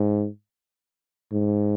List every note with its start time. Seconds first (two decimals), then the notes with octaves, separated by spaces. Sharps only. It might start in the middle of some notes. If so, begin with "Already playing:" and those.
Already playing: G#2
1.32 G#2